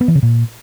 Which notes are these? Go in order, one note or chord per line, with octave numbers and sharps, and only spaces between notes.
B3
E3
C#3
A#2